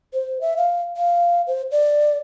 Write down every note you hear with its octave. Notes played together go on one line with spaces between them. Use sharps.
C5
E5
F5
F5
C5
D5